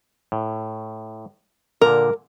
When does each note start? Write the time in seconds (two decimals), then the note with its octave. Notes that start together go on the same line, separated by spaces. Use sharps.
0.32 A2
1.81 A#2 D3 A#4